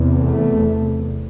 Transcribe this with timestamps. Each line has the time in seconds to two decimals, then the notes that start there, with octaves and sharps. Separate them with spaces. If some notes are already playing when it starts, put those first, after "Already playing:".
Already playing: E2 C3
0.21 A3